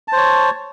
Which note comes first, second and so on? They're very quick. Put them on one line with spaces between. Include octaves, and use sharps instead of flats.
A5 C5 C#5